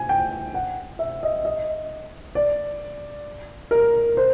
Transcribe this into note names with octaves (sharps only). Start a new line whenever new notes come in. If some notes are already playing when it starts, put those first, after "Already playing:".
Already playing: G#5
G5
F#5
E5
D#5
D#5
D5
A#4
C5